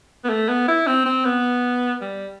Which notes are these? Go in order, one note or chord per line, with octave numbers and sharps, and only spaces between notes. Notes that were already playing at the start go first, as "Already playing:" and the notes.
B3
A3
B3
E4
C4
C4
B3
G3